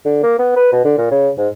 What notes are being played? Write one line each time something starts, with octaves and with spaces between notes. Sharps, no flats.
D3
A#3
B3
B4
B2
D3
A#2
C#3
G#2